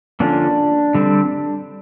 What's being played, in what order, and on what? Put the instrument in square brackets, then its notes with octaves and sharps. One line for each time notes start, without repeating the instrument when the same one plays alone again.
[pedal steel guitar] D3 F3 A#3 C#4 D4
D3 G3 C4